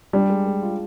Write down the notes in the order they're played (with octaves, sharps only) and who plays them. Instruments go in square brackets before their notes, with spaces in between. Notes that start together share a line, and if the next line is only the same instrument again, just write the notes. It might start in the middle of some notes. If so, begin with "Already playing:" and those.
[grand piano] G3 [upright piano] D4
[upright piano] G#3
G#3
F4